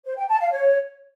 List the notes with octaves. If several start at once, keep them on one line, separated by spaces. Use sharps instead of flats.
C5
G5
A5
F5
C#5